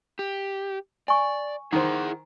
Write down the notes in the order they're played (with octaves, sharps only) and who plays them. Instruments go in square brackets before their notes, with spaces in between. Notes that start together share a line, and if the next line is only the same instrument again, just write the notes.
[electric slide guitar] G4
[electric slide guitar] D5 [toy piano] G#5 C#6
[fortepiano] D#3 C5 [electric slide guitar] E4 G#4 F#5